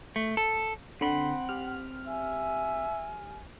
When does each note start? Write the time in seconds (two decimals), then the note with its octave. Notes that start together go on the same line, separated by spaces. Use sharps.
0.16 A3
0.37 A4
1.01 D3 C4 F#5 B5 C6
1.49 G4 F6
2.08 E5 G#5